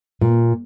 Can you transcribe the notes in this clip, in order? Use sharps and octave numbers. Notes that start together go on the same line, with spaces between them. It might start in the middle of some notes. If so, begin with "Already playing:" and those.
A#2